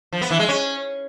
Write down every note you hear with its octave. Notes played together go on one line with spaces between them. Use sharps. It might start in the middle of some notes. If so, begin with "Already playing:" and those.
F3
B3
E3
G#3
C#4